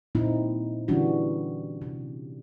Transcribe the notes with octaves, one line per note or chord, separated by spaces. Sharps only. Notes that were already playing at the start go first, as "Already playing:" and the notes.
A#2 G3 A#3 C4 D#4 E4
D3 E3 G3 C#4 D4 F#4
C3